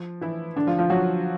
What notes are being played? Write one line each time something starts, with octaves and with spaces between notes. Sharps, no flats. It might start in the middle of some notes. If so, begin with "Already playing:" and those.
Already playing: F3
E3 E4
D3 D4
F3 F4
F3 F4
F#3 F#4